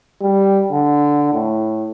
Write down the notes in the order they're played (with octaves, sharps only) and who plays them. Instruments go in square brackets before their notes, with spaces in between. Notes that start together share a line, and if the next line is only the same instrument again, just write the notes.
[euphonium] G3
D3
A2